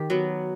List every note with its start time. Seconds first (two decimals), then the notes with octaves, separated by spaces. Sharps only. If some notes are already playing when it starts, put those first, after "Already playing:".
Already playing: D#3 G4
0.10 F#3 B3